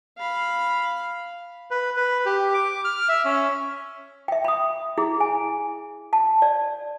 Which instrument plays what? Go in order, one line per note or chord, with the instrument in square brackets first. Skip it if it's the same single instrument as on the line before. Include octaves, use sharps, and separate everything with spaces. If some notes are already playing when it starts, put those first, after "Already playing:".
[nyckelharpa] F5 B5
[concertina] B4
B4
G4
D6
F6
E5
C#4
[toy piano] E5 G5
B5 D#6
E4 G#4
G#5
A5
D5